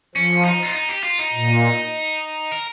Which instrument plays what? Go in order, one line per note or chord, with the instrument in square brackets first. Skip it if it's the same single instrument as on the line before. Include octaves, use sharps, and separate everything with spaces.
[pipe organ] F3 [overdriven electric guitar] C#4
[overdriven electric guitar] D#4
F4
D#4
G4
F4
D#4
[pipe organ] A#2
[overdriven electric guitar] A#4